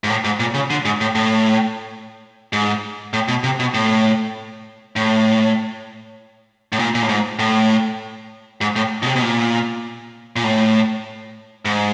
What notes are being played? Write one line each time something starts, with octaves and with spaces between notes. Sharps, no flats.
G#2
A2
G#2
A#2
C#3
D3
G#2
A2
A2
G#2
A2
B2
C3
B2
A2
A2
A2
A#2
A#2
A2
G#2
A2
G#2
A2
B2
C3
B2
A#2
A#2
A2
G#2